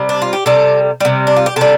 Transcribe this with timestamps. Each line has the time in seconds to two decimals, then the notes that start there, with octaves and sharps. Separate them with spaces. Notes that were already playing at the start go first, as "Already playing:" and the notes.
Already playing: C3 G3
0.09 D4
0.22 F4
0.33 G4
0.46 C3 G3 A4
1.00 C3 G3
1.27 D4
1.36 F4
1.46 G4
1.56 C3 G3 A4